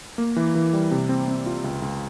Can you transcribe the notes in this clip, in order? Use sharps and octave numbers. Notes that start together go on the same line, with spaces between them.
A#3
E3
E3
G3
C3
C4
C4
F4
C#2
C#2